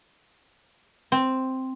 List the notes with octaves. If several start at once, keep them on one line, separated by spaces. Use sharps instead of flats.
C4